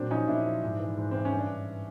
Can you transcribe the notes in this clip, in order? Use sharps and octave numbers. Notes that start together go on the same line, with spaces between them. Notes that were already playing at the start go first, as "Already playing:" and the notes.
Already playing: A#2 F#3 C4 D4
F3 C#4 D#4
A#2 D4 E4
F3
G#2
E3
G#2
E3 C4
C#4
G2
D4